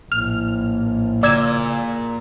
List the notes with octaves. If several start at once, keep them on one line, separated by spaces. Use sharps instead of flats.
A#1 A2 F6
A#2 C#3 D5 E6 G#6